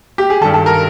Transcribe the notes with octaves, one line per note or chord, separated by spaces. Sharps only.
G4
G#4
G2 D#3 A4
A4
A#4